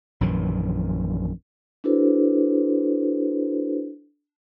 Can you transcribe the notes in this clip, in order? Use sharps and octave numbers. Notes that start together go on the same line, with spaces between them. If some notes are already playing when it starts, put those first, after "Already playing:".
A#1 F#2 D#3 E3
D4 E4 F#4 A4 B4 C5